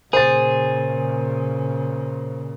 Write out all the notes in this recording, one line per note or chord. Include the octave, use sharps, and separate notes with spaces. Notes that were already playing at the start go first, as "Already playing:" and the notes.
A#2 C#3 G#4 C5 A6